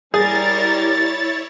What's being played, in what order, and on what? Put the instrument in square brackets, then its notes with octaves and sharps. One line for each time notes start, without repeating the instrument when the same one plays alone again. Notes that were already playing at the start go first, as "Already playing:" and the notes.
[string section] G3 A#4 [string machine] E4 C#5 [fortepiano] G#4 [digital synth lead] A6